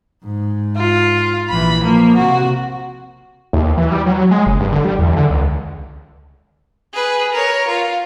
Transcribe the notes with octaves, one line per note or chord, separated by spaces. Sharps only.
G#2
F4
A#1 E3 B5
F3 A#3
C3 F#4
D#2
E3
G3
F#3
G#3
F#1
G2
D3
G3
E2
D3
C#2
G#4 B4
A#4 C#5
F4